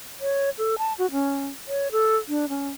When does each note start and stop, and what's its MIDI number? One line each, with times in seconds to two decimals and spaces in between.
0.21 0.50 73
0.58 0.75 69
0.78 0.93 81
0.98 1.11 66
1.12 1.46 61
1.68 1.91 73
1.92 2.17 69
2.29 2.45 62
2.49 2.68 61